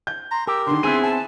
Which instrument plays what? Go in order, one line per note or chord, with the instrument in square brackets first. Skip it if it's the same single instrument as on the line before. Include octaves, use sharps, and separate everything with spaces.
[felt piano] G6
[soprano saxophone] A#5 [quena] C6
[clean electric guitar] G4 [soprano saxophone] A#4 [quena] E6
[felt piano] D3 D#3 [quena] C6
[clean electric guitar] B3 C4 E4 [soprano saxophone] G#4 [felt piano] D#7
[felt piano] G#5 [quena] A5